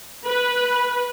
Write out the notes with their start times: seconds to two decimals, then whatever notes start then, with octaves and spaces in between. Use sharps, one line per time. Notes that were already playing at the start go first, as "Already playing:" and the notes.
0.25 B4